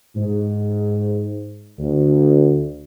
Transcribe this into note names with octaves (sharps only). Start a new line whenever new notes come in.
G#2
D2